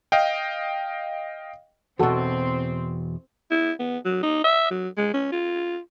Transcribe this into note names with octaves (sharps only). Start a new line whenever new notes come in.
D#5 F5 G5
E2 B2 C4 F#4 A4
E4
B3
F#3
D#4
E5
F#3
G#3
C#4
F4